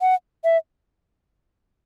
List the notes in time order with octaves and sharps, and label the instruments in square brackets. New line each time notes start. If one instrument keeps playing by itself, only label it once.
[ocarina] F#5
E5